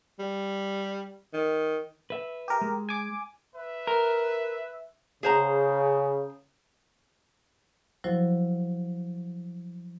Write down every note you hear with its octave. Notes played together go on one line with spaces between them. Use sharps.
G3
D#3
B4 E5
G4 A#4
G#3
G#5 D6
B4 E5
A#4
C#3 G#4 C5 A#5
F3 F#3 E4 F#4 C5